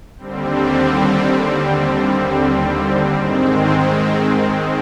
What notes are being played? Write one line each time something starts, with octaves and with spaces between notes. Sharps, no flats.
D#2 D3 G3 C4
G#2 D#3 G#3 C4